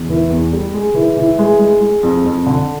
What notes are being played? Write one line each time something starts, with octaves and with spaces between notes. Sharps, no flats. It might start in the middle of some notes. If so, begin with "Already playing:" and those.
Already playing: E2
E3
E2
G3
G#3
E3
E3
G#3
G#3
G#3
F2
F2
D3